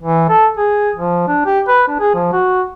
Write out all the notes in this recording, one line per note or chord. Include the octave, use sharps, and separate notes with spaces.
E3
A4
G#4
F3
D4
G4
B4
D4
G#4
F3
F#4